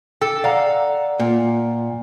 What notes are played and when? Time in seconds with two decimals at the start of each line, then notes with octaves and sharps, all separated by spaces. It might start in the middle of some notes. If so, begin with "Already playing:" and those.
0.21 A4 G5
0.44 D5 F5 F#5 A#5
1.20 A#2